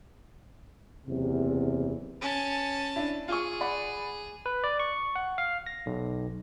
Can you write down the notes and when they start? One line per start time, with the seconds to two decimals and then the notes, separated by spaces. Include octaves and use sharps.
1.07 F#1 E2 C3
2.21 C#4 A5
2.96 D4 E4
3.28 F4 G#4 C#6
3.61 D5 F#5 B5
4.46 B4
4.64 D5
4.79 C#6
5.16 F#5
5.38 F5
5.66 A#6
5.86 B1